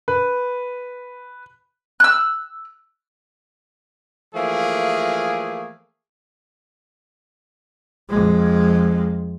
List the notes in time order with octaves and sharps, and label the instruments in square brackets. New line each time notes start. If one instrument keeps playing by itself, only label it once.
[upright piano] B4
[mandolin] E6 F#6
[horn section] E3 F3 A3 A#3 G#4
[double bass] F2 G#3